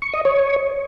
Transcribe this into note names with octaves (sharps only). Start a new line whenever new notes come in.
C#6
D#5
C#5